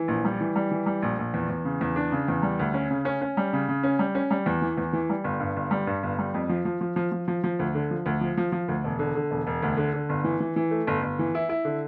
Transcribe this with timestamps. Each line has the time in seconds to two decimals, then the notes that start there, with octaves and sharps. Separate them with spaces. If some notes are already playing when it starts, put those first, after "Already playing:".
Already playing: E3
0.08 A#1
0.25 G3
0.41 E3
0.56 G3
0.71 E3
0.86 G3
1.02 A#1
1.19 A#1
1.34 E2
1.49 E2
1.65 C#3
1.81 E2
1.96 D4
2.12 C#3
2.28 E2
2.43 G3
2.59 D2
2.74 C#4
2.91 C#3
3.05 C#4
3.22 C#4
3.37 G3
3.53 C#3
3.69 C#3
3.83 C#4
3.99 G3
4.15 C#4
4.31 G3
4.46 E2
4.62 E3
4.77 E2
4.93 E3
5.09 G3
5.24 G1
5.40 G2
5.56 G1
5.71 G3
5.87 G2
6.03 G1
6.19 G3
6.34 F2
6.49 F3
6.65 F3
6.81 F3
6.96 F3
7.12 F3
7.28 F3
7.44 F3
7.59 D2
7.75 D3
7.91 F3
8.06 D2
8.21 F3
8.37 F3
8.52 F3
8.68 D2
8.84 E1
8.99 D3
9.15 D3
9.31 E1
9.47 E1
9.62 D2
9.77 D3
9.94 D3
10.09 G1
10.24 E3
10.40 E3
10.56 E3
10.71 A3
10.87 G1
11.03 G1
11.19 E3
11.35 E4
11.49 E4
11.65 D3